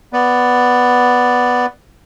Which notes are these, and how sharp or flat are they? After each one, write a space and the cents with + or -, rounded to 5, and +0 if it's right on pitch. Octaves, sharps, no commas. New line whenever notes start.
B3 +0 D5 +0